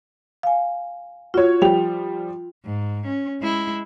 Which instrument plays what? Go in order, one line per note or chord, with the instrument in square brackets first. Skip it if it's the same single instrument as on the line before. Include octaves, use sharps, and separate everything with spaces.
[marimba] F5 G#5
[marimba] F4 [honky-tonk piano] F#4 C#5
[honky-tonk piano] F3 G3 F7 [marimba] G5
[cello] G#2
C#4
G#3 E4